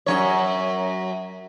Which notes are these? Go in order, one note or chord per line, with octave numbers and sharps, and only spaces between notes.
F#2 F3 C#5